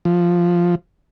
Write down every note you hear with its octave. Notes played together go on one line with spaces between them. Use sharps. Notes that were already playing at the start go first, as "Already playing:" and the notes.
F3